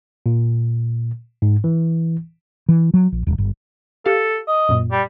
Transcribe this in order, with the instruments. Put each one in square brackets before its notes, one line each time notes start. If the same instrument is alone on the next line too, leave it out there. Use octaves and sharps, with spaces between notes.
[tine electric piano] A#2
G#2
E3
[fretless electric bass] E3
F#3
A#1
D#1
G1
[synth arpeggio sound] G4 F5 [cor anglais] A4
[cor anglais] D#5
[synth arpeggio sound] F#2 A#2
[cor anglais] G3